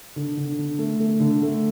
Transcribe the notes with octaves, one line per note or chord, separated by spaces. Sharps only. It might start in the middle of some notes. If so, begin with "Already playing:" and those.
D3
D3
D3
A3
A3
D3
A3